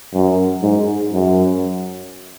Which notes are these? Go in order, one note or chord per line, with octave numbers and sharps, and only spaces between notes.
F#2
G#2
F#2